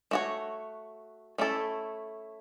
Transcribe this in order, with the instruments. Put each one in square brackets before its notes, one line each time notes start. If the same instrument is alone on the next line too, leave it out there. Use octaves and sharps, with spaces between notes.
[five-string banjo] A3 F#4 C#5
A3 C#4 E4 A4